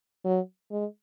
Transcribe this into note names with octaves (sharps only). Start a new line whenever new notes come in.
F#3
G#3